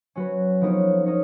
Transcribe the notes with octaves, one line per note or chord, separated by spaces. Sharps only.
F#3 C#4 F#4 B4
F3 B3 D#4 A#4 C#5
D#4 A#4 C#5